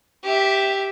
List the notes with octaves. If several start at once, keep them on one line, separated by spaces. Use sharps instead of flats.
G4 E5